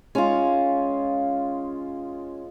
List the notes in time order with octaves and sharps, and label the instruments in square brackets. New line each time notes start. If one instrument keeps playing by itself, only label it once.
[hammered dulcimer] G#3 F4 [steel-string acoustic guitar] C#4